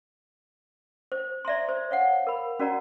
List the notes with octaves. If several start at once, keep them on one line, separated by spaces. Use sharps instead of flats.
C5
D5 E5 A#5 C6
C5
C#5 F5 F#5
A#4 B5
C#4 F#4 A#4 D5 F#5 A#5